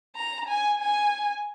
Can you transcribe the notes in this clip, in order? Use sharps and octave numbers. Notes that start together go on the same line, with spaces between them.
A#5
G#5
G#5